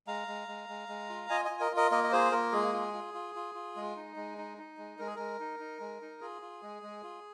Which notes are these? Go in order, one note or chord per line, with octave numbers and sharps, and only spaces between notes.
G#3 F5 A#5
G#3
G#3
G#3
G#3
F4
F4 D#5 G#5
D#5 G#5
F4
A#4 D#5
F4
A#4 D#5
A#3 A#4 D#5
D#5
F4 G#4 C5
A#3 A#4
G#3 G#4
F4
F4
F4
F4
F4
G#3
D#4
G#3
D#4
D#4
G#3
G#3 A#4
G#4
G#3 A#4
D#4
D#4
G#3
D#4
F4 G#4
F4
G#3
G#3
F4